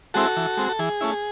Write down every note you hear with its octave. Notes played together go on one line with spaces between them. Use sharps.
G#3 C4 E4 F#4 A4
E3
G#3 C4
A4
E3 G#4
A3 C#4 E4